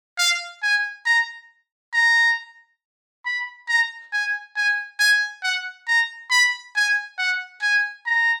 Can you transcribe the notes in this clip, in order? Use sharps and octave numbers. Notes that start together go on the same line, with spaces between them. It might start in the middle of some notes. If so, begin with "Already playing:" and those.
F5
G#5
A#5
A#5
B5
A#5
G#5
G#5
G#5
F#5
A#5
B5
G#5
F#5
G#5
A#5